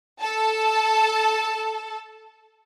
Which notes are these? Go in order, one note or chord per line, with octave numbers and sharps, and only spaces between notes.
A4 A5